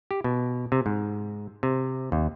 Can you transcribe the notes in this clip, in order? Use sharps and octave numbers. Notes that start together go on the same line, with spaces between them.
G4
B2
C3
G#2
C3
D#2